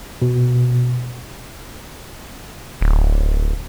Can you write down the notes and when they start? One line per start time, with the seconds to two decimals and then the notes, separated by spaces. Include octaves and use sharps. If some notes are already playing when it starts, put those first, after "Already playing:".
0.22 B2
2.81 D1